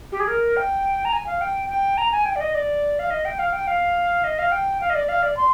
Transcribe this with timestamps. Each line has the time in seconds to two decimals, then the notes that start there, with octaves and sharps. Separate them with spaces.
0.12 G4
0.19 G#4
0.27 A#4
0.56 G5
1.04 A#5
1.12 G#5
1.26 F5
1.41 G5
1.69 G5
1.97 A#5
2.11 G#5
2.25 G5
2.35 D5
2.40 D#5
2.54 D5
2.99 F5
3.10 D#5
3.24 G5
3.38 F5
3.52 G5
3.67 F5
4.23 D#5
4.38 F5
4.51 G5
4.80 F5
4.89 D#5
4.94 D5
5.08 F5
5.22 D5
5.36 C6